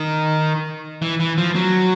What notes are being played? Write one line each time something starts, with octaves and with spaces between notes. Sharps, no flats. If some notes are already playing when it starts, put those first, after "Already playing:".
Already playing: D#3
E3
E3
F3
F#3